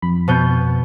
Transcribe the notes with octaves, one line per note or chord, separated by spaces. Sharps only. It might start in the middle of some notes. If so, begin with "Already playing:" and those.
F2 B5
B2 B3 G6